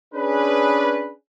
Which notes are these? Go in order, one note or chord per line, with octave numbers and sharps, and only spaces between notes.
C#4 D4 G#4 B4